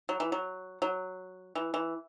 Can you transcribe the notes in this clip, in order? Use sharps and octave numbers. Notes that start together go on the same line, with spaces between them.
F#3
E3
F#3
F#3
E3
E3